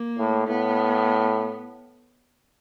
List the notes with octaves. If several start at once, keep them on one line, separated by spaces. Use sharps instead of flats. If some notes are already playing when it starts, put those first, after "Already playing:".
Already playing: A#3
A2
A2 B3